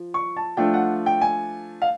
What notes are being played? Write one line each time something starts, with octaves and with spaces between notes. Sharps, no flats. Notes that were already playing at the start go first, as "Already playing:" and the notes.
Already playing: F3
C#6
A5
F3 A3 D4 F4 G5
F#5
G5
G#5
F5